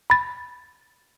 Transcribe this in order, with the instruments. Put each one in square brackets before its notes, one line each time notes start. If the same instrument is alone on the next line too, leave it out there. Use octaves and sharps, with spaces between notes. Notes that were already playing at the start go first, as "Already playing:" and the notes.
[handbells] B5 A6